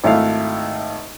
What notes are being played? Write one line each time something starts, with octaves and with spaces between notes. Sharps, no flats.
G#1 A3 E4 F5